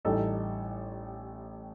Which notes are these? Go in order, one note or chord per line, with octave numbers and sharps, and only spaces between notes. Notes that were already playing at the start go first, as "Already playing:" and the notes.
A1 A2 G3 D#4 A4